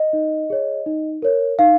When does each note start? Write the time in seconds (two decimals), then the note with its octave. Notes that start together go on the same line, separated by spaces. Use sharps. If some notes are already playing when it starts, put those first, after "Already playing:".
Already playing: D#5
0.13 D#4
0.50 G#4 C#5
0.86 D#4
1.22 A#4 C#5
1.59 D#4 F5